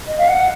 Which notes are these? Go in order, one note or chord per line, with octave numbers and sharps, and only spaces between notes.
D#5
F5
F#5